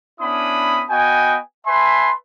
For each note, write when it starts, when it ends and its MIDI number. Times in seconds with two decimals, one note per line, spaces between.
0.20 0.84 59
0.20 0.84 61
0.20 0.84 62
0.20 0.84 64
0.20 0.84 83
0.20 0.84 87
0.90 1.38 59
0.90 1.38 66
0.90 1.38 75
0.90 1.38 79
0.90 1.38 80
1.67 2.12 71
1.67 2.12 76
1.67 2.12 80
1.67 2.12 81
1.67 2.12 84